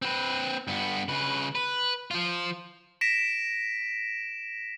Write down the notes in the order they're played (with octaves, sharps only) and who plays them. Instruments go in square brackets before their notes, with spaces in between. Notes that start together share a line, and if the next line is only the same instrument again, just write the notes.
[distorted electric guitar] C4 B4
G2 B3
C#3 B4
B4
F3 F4
[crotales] A#6 B6 D7 E7